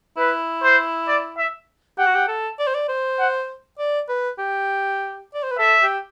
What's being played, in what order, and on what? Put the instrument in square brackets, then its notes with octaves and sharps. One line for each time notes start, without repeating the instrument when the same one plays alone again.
[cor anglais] E4 [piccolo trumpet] B4
[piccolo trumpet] C5
D5
E5
[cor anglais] G4 [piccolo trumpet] F#5
[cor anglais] F#4
G4
A4
D5
C5
D5
C5
[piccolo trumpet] F#5
[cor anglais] D5
B4
G4
D5
C5
B4
[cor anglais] A4 [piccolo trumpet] E5
[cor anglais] G4